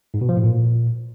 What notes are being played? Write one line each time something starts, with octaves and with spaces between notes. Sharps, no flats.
G#2
B2
F3
A2
A#2